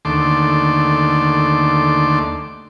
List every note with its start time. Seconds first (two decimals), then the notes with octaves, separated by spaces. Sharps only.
0.05 D#2 D3 A3 C6 D6